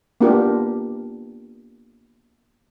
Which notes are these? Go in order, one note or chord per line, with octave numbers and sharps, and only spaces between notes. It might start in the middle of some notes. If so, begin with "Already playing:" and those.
A#3 B3 D4 F4 G4 A#4